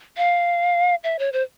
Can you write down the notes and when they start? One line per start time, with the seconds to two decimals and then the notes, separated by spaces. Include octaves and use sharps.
0.17 F5
1.04 E5
1.19 C#5
1.33 C5